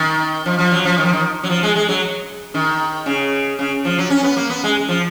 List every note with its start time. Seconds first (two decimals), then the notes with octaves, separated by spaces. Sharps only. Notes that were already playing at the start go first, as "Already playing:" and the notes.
Already playing: D#3
0.46 F3
0.58 F3
0.72 F#3
0.85 F3
0.98 D#3
1.06 F3
1.13 D#3
1.43 F#3
1.50 F3
1.63 G#3
1.76 G#3
1.88 F#3
2.54 D#3
3.06 C#3
3.59 C#3
3.85 F3
3.98 F#3
4.10 C#4
4.23 B3
4.37 A#3
4.50 B3
4.64 G#3
4.88 F3